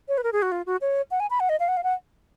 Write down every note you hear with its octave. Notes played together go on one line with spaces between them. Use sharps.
C#5
B4
A#4
G#4
F#4
F4
F#4
C#5
F#5
G#5
B5
F#5
D#5
F5
F#5
F5
F#5